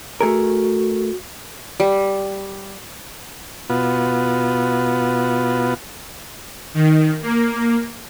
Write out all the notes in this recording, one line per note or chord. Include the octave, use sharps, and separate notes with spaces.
A3 F#4 G#4 A#4
G3
B2 B3 F4 F#4
D#3
A#3